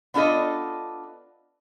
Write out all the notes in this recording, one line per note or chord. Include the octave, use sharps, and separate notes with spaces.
B3 D4 F4 A4 D#5